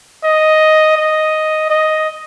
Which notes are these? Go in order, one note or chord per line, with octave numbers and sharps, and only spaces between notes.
D#5
D#5
D#5